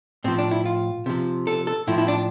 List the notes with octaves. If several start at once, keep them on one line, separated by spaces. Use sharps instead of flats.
A2 F3 C4
D4
E4
F4
C3 F3
A4
A4
A2 F3 E4
E4
D4